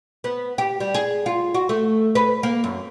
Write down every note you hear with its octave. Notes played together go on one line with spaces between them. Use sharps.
B3
G4
G3
G#4
F4
F#4
A3
B4
A#3
F#2